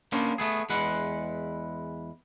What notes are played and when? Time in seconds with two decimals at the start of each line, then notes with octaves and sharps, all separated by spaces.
0.12 A#3 B3 C#4 D4 C5
0.38 A3 B3 G#4
0.70 E2 G#3 B4 F#5